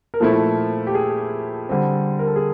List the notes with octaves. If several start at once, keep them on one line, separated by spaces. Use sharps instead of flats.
A#4
A#2 F3 A3 C4 E4 A4
G4
G#4
D3 G3 C4
A#4
A4
G#4